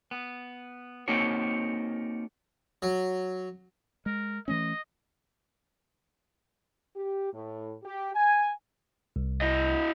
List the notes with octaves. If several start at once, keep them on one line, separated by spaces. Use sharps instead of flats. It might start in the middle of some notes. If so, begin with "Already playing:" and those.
B3
A#3 C4 D#4 F#4 A4 C#5
F#3
G#3 A#4
E3 A3 C#4 D#5
G4
A2
G4
G#5
C2
E4 D#5